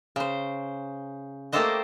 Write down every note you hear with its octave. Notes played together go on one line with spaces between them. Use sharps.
C#3 C5
A3 A#3 G4 A4 C5 D#5